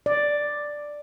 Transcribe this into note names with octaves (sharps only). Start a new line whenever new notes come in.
D5